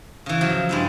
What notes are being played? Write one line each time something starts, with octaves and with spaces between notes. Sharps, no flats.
C#3 E3
F3 F#3
G2 G#3 E4